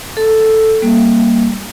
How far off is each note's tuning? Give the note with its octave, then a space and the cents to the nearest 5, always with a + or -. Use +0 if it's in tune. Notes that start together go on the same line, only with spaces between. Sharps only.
A4 +0 A5 +0
G3 +0 A#3 +0